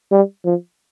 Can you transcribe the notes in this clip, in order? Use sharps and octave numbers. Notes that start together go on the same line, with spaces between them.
G3
F3